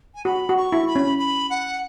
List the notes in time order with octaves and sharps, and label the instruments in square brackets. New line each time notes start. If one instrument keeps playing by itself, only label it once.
[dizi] G#5
[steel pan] F#4 [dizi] B5
[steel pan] F#4
[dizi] C#6
[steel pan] E4
[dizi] B5
[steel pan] C#4
[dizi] B5
F#5